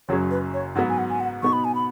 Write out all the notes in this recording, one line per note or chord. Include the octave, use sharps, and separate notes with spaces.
F#1 F#2 F#3 C#4 G#4 C#5
B4
C#5
G#2 F#3 B3 F#5
G#5
F#5
G#5
F#5
B2 B3 D#4 C#6
B5
G#5
B5